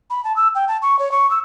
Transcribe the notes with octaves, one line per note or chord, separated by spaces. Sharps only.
B5
A5
E6
G5
A5
C#6
C#5
C#6
E6